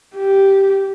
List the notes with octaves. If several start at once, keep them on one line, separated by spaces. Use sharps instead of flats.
G4